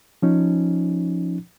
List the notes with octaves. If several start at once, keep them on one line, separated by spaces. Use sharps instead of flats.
F3 C#4 D#4